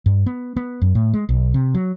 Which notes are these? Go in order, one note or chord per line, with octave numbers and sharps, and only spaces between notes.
G2
B3
B3
F#2
A2
G#3
B1
C3
F#3